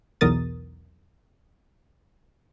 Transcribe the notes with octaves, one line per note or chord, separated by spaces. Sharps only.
B1 E2 B2 A#4 D#6 A6